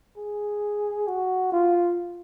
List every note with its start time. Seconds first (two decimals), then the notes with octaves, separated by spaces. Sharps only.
0.17 G#4
1.07 F#4
1.52 F4